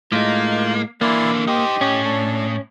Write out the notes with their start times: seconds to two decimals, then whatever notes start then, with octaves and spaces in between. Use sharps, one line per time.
0.12 A2 G#3 A#3 D#4 F4
1.01 D3 E3 A#3 E4 D5 C6
1.47 D#4 G4 C5 D#5
1.81 A2 C#4
2.04 D4 A4